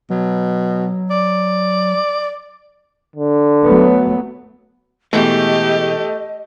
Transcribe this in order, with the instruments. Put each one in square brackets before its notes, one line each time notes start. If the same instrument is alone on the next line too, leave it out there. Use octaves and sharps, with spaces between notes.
[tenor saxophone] B2 [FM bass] F#3
[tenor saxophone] D5
[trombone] D3
[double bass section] F#3 A3 B3
[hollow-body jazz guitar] B2 E3 G#3 [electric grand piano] A3 [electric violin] G4 [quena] D#5